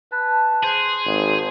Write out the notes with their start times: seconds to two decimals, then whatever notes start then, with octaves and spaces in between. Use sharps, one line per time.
0.12 B4 A5
0.64 G#4 C5 C6
1.05 G#1